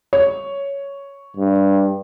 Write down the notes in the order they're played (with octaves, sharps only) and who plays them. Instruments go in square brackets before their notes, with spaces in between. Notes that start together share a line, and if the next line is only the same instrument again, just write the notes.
[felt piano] C#5
[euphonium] G2